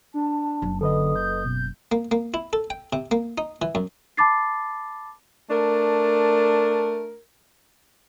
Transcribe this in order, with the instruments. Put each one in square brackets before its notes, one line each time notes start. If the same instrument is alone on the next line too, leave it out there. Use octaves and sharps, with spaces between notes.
[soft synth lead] D4 [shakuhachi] A5
[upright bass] F#1
[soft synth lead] D3 [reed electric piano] A4 B4 D#5 [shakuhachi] D#6
[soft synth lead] G6
[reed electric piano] B2
[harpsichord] A#3
A#3
E4
A4
G5
C3
A#3
D#4
E3
F#2
[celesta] A5 B5 D6 A6 C7
[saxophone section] A3 D4 A#4